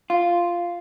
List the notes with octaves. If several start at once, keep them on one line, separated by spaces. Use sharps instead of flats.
F4